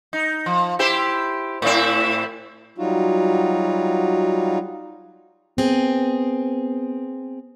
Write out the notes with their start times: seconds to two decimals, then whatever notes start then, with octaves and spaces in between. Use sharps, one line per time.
0.13 D#4
0.46 F3
0.79 E4 G4 C5
1.62 A2 C4 E4
2.78 F#3 G3 D#4 F4 F#4
5.58 B3 C4 G#4